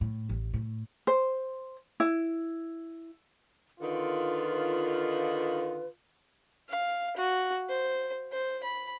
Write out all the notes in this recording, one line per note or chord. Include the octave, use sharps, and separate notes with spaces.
A2
A1
A2
C5
E4
D3 D#3 F4 B4
F5
F#4
C5
C5
B5